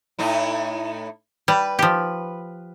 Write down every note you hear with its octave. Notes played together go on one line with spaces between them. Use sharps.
A2 D#4 E4
G3 B4
F3 G4